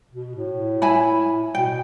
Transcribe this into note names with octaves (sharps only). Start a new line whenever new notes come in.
B2
A2
E4 G#5 B5
B2 G5